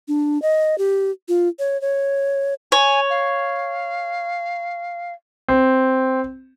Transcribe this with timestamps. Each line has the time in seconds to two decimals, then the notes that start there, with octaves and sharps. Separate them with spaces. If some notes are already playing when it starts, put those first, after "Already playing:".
0.08 D4
0.42 D#5
0.78 G4
1.28 F4
1.59 C#5
1.82 C#5
2.72 C#5 G#5
3.10 F5
5.48 C4